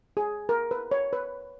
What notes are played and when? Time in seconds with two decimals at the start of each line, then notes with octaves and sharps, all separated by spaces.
0.17 G#4
0.49 A#4
0.71 B4
0.91 C#5
1.13 B4